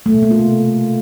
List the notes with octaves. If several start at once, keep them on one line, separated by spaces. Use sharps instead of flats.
A3
B2
A#3
F4
C3